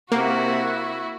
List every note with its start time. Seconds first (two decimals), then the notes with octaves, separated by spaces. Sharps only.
0.12 C3 A#3 E4 F#4 F#5